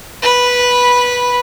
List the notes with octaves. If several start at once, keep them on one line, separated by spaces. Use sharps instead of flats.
B4 B5